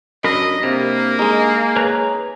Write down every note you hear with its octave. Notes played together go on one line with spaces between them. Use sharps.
F#2 D4 A#4 D#5 B5
C3 A#3
G#3 D#4 G#4
B4 C#5 A#5